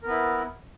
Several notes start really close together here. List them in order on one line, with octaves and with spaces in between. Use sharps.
A#4 B3 E4